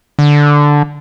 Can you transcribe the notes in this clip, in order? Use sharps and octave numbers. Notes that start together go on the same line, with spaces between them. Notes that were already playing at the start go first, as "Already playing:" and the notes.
D3